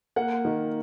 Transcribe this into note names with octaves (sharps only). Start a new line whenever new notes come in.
A#3 F#5
D#3